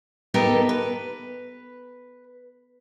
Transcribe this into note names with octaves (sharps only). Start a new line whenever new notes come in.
B3 D#4 G4 A4 A#4
B4